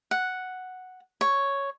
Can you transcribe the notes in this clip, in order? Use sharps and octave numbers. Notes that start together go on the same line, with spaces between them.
F#5
C#5